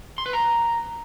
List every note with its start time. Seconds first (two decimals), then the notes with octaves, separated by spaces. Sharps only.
0.18 C6
0.26 B4
0.33 A#5